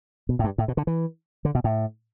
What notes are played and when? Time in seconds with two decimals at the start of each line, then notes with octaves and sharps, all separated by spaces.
0.29 B2
0.39 A2
0.44 G2
0.58 A2
0.68 B2
0.77 D3
0.87 E3
1.45 D3
1.55 B2
1.64 A2